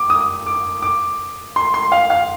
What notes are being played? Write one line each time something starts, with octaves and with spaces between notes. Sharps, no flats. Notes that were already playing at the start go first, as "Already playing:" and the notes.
Already playing: D6
D#6
D6
D6
C6
C6
F5
F5